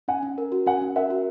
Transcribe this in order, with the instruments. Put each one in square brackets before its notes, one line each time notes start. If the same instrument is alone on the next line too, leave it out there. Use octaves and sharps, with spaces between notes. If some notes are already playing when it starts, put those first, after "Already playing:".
[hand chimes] C#4 [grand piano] F#5 G#5
[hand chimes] C#4
A#4
F#4
[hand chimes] C#4 [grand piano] F#5 G#5
[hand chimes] C#4
[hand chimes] A#4 [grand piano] E5 F#5
[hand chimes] F#4